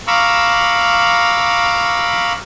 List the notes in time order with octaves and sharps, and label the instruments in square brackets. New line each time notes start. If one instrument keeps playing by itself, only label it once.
[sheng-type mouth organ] F5 A#5 B5 C#6 D6 E6